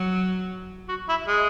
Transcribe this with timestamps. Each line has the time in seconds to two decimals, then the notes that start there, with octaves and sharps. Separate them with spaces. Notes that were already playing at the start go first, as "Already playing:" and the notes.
Already playing: F#3
0.89 F#4
1.09 E4
1.27 G#3